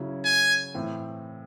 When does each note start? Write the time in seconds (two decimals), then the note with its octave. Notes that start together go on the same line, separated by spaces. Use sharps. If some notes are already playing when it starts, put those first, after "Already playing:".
Already playing: C#3 F#3 C#4 E4
0.25 G#5
0.74 A2 E3 C4